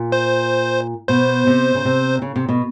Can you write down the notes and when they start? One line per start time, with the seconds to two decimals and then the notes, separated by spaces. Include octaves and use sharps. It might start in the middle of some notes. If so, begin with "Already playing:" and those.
Already playing: A#2
0.12 C5
1.08 B2 C5
1.47 C3
1.75 C#3
1.85 C3
2.22 C#3
2.36 C3
2.49 B2